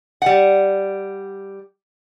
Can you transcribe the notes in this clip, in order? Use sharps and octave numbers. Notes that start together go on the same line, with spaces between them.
G3 F#5